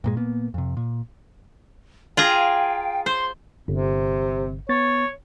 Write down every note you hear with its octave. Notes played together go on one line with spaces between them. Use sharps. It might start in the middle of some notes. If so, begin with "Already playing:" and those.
G2 A#2 G#3
A#2 A#3 B3
F2 C3
A#2
F4 G#4 F5 G5 A#5
C5 C6
G1 C3
B3 C#5 A6